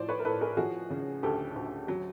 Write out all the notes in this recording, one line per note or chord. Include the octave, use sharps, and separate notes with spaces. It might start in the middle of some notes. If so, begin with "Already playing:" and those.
Already playing: A2 F3 C5 D5
B4 C#5
A#4
A2 A4 B4
G#4 A#4
F3 F#4 G#4
C#3
D2 G4 A4
D2
F#3